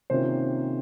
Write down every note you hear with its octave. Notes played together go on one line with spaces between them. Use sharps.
C3 D#3 A#3 C#4 F4 C5